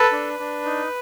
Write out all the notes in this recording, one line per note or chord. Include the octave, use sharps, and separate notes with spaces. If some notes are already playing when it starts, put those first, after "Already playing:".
Already playing: A4 B4
D4
D4
D#4